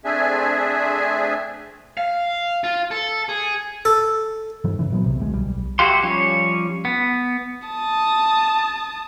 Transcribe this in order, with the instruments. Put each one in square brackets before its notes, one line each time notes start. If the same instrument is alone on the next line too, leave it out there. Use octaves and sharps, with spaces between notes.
[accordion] A3 C4 D4 G#4 E5 G#5
[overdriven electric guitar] F5
F4
A4
G#4
[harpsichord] A4
[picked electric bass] G2 D#3 F3 G3
C#3 E3
A#2 F#3 B3
B1 C3
D2 G#3
B1 G3
[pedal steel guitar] E4 F#4 G4 F5 C6
F3 G3 C#4 C#5
B3
[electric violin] A5 D#6